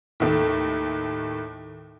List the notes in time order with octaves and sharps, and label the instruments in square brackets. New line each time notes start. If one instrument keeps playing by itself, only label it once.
[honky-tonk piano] D#2 A2